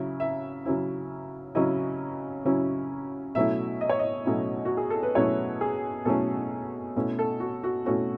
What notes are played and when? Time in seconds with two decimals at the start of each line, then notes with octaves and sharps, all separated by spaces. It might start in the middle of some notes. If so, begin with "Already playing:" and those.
Already playing: C#3 F#3 C#4 E4
0.20 E5
0.65 C#3 F#3 C#4 E4
1.55 C#3 F#3 C#4 E4 D#5
2.45 C#3 F#3 C#4 E4
3.35 B2 F#3 A3 C#4 E4 E5
3.81 D#5
3.89 C#5
3.99 D#5
4.25 B2 F#3 A3 C#4 E4
4.65 F#4
4.77 G#4
4.90 A4
5.03 B4
5.15 B2 F#3 A3 C#4 E4 C#5
5.61 G#4
6.05 B2 F#3 A3 C#4 E4 A4
6.96 B2 A3 C#4 E4
7.19 A4
7.40 F#4
7.64 F#4
7.85 B2 A3 C#4 E4 F#4